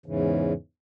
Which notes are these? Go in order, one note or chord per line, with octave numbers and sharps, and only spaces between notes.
E2 G#2 C#3 E3